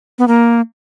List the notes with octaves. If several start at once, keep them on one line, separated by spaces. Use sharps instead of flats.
B3
A#3